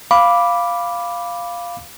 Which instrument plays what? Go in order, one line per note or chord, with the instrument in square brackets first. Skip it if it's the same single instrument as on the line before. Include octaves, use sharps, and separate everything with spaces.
[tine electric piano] F5 B5 D6